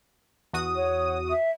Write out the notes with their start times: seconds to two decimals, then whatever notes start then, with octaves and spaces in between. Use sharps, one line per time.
0.53 E2 F#4 D#6
0.76 C#5
1.30 E5